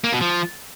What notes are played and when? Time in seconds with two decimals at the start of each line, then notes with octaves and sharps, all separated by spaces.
0.04 A#3
0.12 B2
0.21 F3